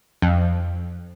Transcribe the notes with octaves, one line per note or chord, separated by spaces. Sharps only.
F2